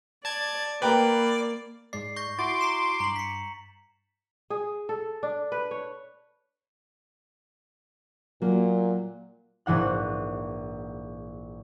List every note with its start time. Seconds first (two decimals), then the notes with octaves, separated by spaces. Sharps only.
0.25 D5 A5 G#6
0.82 A#3 B4 D5 G5 A#5
1.93 G#2 G#3 D5 C7
2.16 C#6 G6 A#6
2.39 E4 F#4 C6 D6 A6
2.61 A#5 C7 E7
3.00 G2 A#5 F#7
3.16 B6 C#7
4.50 G#4
4.89 A4
5.23 D4
5.52 B4
5.71 C#5
8.42 A#2 F#3 A#3
9.66 A#1 G#2 E3 F#5 F#6